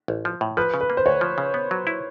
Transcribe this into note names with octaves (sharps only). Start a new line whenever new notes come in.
A1
F3
A2
F3 B4
C#3
B4
A#3
C5
D2 C#5
F3
C#3
B3
F#3
E4